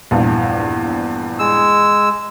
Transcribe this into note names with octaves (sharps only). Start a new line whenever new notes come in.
A#1 E2 G2
G#3 E6